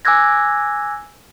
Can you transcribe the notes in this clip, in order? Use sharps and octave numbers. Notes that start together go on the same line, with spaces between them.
G#5 D6 E6 F#6 G#6 A#6